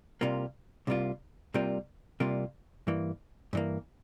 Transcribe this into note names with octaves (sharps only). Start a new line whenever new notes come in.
C2 C3 G3 A#3 F4
C2 C3 G3 A#3 F4
C2 C3 G3 A#3 F4
C2 C3 G3 A#3 F4
G2 E3 A#3
G2 E3 A#3